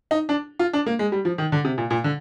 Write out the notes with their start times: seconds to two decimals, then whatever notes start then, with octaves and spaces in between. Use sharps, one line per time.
0.11 D#4
0.29 D4
0.59 F4
0.73 D4
0.86 A#3
0.99 G#3
1.12 G3
1.25 F3
1.38 D#3
1.52 D3
1.65 C3
1.78 A#2
1.90 A#2
2.04 D3